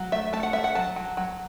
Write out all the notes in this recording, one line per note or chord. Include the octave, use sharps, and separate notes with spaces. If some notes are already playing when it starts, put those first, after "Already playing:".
Already playing: F#3
A3 E5
A3 A5
F#5
A3 E5
F#5
F#3 A5
F#3
F#3